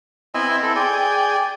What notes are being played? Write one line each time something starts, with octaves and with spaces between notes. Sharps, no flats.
B3 C4 E4 D#5 G#5
A4
G#4 D5 G5